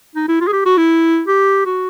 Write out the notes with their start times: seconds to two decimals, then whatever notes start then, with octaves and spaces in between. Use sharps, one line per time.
0.16 D#4
0.28 E4
0.41 F4
0.48 G#4
0.53 G4
0.66 F#4
0.78 E4
1.28 G4
1.66 F#4